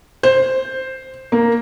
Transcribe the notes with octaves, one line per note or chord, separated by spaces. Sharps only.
C5
A#3